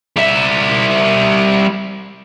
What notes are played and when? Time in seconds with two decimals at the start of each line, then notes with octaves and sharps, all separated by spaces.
0.16 G3 E5